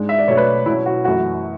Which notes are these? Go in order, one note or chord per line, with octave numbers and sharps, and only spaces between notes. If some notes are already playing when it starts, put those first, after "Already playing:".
Already playing: G#2 G#3 D4
E5
D5
B2 F#3 A3 D4 C#5
B4 D5
B2 F#3 C#4 E4
F#4
F#2 E3 A3 F#4